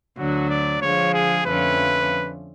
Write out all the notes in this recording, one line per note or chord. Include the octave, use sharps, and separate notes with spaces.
D2 D3 F#3 F#4
D5
D3 F3 G#3 C#5
G#4
F2 D3 F3 A3 C#4 B4